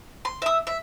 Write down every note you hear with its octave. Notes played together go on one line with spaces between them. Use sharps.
C6
E5 D#6
E5